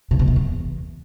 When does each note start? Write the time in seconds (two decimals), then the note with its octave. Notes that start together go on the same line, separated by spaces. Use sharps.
0.11 C3
0.19 B2
0.28 C3
0.36 E2